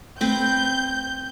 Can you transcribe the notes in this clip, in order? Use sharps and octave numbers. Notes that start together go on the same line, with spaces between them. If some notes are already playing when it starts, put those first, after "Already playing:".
A3 C4 B4 G6